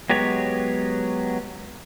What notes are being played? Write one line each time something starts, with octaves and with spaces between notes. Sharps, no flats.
F#3 G#3 B3 G4 C#5